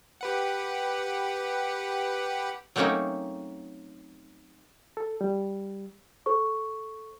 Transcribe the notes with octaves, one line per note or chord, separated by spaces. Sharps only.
G4 B4 F#5
F#3 A3 A#3 C4 C#4 D#4
A4
G3
A4 C5 C#6